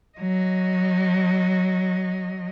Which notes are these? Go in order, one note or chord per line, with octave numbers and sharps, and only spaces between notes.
F#3 D#5